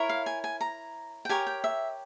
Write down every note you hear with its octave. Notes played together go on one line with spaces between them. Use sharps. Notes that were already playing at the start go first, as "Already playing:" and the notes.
Already playing: E4 A#4 C#5
F5
G#5
G#5
A#5
G5
G4 A#4 C#5 G#5
G5
E5